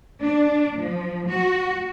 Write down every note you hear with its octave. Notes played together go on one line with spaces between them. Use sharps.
D4
F3
F#4